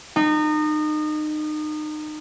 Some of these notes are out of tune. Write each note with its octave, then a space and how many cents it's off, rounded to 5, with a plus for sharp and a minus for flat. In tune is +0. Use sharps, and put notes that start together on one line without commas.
D#4 -30